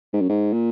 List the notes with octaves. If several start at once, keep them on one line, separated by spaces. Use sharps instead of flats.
G#2
F#2
G#2
A#2